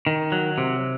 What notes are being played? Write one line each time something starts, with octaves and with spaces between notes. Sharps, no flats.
D#3
F#3
C3